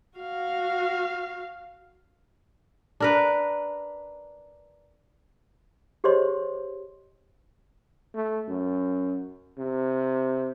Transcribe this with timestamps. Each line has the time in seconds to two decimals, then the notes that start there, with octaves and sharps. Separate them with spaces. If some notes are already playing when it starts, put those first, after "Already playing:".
0.18 F#4 F5
3.00 D4 A#4 B4
6.04 G4 G#4 C5 C#5 D#5 C6
8.15 A3
8.48 F#2
9.58 C3